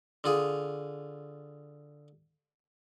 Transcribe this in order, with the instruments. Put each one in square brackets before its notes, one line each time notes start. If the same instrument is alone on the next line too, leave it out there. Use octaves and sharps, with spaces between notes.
[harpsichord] D3 F4 G#4